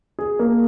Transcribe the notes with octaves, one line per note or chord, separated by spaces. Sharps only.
G#4
A#3